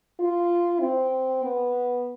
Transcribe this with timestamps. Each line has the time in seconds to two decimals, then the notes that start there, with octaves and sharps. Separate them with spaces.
0.19 F4
0.80 C4
1.44 B3